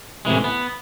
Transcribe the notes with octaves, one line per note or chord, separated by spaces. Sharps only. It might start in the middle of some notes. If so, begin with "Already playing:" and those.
A2 C3 E3 G#3
B3